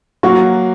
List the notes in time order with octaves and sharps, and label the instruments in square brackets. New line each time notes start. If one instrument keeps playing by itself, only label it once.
[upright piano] F#3 A#3 [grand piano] F#4